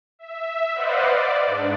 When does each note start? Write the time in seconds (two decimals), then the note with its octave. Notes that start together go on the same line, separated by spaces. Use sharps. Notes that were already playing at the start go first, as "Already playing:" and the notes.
0.19 E5
0.74 B4 C5 D5 D#5 F5 F#5
1.09 D5
1.46 G#2 D4